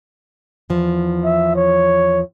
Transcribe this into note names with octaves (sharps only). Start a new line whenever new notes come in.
E2 F3
E5
C#5